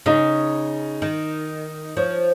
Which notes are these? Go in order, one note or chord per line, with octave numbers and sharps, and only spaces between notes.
C#3 D#4
D#3
F3 C#5